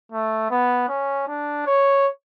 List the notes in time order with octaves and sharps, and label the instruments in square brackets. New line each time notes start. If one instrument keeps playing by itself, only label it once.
[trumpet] A3
B3
C#4
D4
C#5